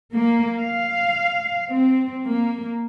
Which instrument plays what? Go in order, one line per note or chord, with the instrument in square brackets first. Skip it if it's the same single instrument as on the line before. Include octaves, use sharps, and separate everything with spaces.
[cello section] A#3
F5
C4
A#3